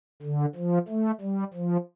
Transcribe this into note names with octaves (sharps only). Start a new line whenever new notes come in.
D3
F3
A3
G3
F3